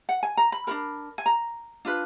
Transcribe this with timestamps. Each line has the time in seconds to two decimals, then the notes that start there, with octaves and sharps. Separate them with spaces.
0.09 F#5
0.23 G#5
0.37 A#5
0.52 B5
0.67 D4 F#4 A#4 B5
1.18 G#5
1.26 A#5
1.85 D4 F4 B4